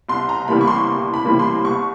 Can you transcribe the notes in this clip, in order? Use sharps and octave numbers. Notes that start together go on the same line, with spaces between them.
C2 C6
A#5
C3 E3 G3 A#3 B5
C#6
C6
C2
B5
C3 E3 G3 A#3
C6
C2 C#6